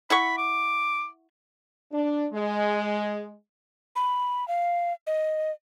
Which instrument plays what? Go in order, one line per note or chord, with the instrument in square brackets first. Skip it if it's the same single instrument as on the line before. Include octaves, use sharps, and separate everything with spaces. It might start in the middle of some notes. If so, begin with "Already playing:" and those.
[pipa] E4 F#5 C#6 [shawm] B5
[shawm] D6
[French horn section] D4
G#3
[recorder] B5
F5
D#5